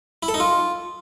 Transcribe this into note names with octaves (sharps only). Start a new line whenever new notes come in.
E4
A4
D#4
F4